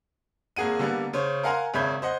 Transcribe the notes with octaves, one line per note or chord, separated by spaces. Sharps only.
G#1 A#3 G#4 F#5 D#7
D3 G3 A#3 B3
C#3 C5 C#5
A#4 F5 F#5 G#5 A#5 C6
G#1 C#3 E5 B5 G6 G#6
C5 D#5 F#5